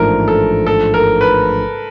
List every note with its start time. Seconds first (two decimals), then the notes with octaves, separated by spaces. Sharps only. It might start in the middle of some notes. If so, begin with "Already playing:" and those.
Already playing: A1 G#2 F3 A3 D4 A#4
0.28 A4
0.67 A4
0.94 A#4
1.21 B4